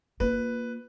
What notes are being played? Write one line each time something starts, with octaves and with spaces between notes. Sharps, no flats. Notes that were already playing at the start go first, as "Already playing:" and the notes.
A#3 F4 B4